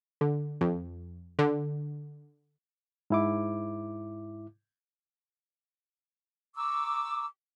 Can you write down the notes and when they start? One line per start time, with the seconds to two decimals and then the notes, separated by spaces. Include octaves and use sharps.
0.21 D3
0.61 F2
1.39 D3
3.10 G#2 E4 D6
6.56 A#5 C#6 D6 E6